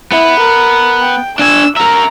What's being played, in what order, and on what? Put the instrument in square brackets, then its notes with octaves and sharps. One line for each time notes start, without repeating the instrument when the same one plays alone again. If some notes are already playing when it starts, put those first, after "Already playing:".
[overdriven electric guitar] B3 [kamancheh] E4
[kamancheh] A#4
G5
[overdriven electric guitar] D4 G#5 [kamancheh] E6
[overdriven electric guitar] A#4 E5 [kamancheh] A#5